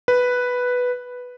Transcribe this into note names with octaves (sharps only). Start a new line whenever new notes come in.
B4